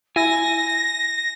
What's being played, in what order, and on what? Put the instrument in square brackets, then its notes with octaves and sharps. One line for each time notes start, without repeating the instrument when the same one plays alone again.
[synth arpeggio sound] E4 [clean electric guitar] G#5 [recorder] A#6